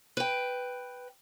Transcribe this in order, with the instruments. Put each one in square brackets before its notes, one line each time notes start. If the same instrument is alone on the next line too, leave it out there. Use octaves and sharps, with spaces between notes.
[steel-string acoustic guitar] B4 G5